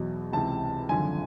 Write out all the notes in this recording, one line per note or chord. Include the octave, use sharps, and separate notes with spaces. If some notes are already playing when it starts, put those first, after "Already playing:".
Already playing: E2 B2 F#3
C#2 C3 E3 A5
G#1 F#2 D3 F3 G#5